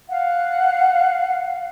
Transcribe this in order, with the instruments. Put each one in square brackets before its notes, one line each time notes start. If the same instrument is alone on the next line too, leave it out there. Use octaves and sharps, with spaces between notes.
[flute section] F5 F#5